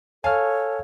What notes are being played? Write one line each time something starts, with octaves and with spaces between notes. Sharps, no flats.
A4 C#5 F5 G#5 A5 F6